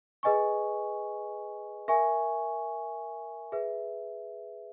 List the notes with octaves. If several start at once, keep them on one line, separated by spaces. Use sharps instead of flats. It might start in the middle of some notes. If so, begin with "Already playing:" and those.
G#4 B4 D#5 G#5 C#6
A#4 E5 G#5 C#6
G#4 B4 E5